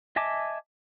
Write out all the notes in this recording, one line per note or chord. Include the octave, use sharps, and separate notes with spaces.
D#5 E5 G#5 A5 D6